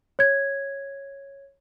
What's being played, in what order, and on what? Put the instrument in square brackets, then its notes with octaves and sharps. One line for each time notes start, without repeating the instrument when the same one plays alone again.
[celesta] C#5 G#6